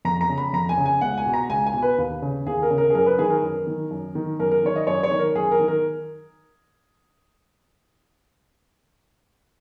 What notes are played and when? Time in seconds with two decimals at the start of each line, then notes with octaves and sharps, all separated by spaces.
0.05 F2 A#5
0.21 A#5
0.29 C#3
0.38 B5
0.53 F2 A#5
0.69 G#5
0.78 C#3
0.86 G#5
1.01 C#2 F#5
1.18 G#5
1.26 B2
1.34 A#5
1.50 C#2 G#5
1.67 G#5
1.74 B2
1.82 B4
1.98 D#2
2.22 C#3
2.46 D#2 G#4
2.63 A#4
2.71 C#3
2.78 A#4
2.90 G#4
2.95 F#2 A#4
3.06 B4
3.19 D#3 G#4
3.30 A#4
3.42 F#2
3.67 D#3
3.91 F#2
4.15 D#3
4.40 F#2 A#4
4.51 A#4
4.63 D#3 C#5
4.76 D#5
4.87 F#2 C#5
5.03 C#5
5.11 D#3
5.19 A#4
5.35 F#2 G#4
5.51 A#4
5.60 D#3
5.68 A#4